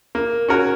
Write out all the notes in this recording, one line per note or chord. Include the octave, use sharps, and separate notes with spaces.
A#3
C#4 F#4 A#4 C#5